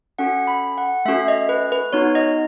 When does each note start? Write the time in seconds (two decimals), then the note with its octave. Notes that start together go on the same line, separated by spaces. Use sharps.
0.19 C#4 F#4 A4 F#5
0.47 B5
0.78 F#5
1.05 A3 C#4 F#4 A4 E5
1.28 D#5
1.49 B4
1.72 B4
1.93 B3 D#4 F#4 C#5
2.15 D#5